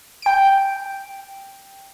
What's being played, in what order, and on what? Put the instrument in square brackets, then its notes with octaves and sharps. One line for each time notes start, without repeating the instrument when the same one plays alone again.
[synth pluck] G5 D7